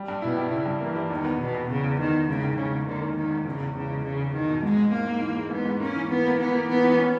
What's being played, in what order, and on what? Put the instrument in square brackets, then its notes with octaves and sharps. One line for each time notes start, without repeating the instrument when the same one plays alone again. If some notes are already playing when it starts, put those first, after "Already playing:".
Already playing: [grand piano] G3
G2
[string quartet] B2 [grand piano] E4
[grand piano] G3
[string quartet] C#3 [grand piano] E4
[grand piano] G2
[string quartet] E3 [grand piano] A#3
[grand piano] G3
[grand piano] E2 [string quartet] D#3
[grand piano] B3
[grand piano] E2 [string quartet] B2
[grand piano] B3
[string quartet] C#3 [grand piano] B3
[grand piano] E2
[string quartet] D#3 [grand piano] B3
[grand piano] E2
[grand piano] G#2 [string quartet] C#3
[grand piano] D#3
[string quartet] C#3 [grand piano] C#4
[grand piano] G#2
[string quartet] D#3 [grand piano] A#3
[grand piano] A#3
[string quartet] D#3 [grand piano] A#3
[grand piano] G#2
[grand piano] E2 [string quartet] C#3
[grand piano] E2
[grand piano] E2 [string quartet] C#3
[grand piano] G#3
[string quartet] C#3 [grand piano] G#3
[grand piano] E2
[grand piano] E2 [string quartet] D#3
[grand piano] B2
[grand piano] G#2 [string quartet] G#3
[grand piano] G#2
[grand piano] G#2 [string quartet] A#3
[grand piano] G#2
E3
G#3
[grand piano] G#2 [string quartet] B3
[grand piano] G#2
[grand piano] A#3 [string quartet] C#4
[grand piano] E3
[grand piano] E3 [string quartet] B3
[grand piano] A#3
[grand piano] E3 [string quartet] B3
[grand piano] A#3
[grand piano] E3 [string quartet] B3
[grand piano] E3
C#4